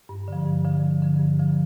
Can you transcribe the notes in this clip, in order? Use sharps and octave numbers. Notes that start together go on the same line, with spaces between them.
G2
D3 F3
G2
D3 F3
G2
D3 F3
G2
D3 F3